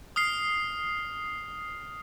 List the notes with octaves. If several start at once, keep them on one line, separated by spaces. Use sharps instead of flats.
D#6 F6 C7